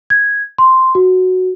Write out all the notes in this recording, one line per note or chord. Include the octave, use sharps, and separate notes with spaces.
G#6
C6
F#4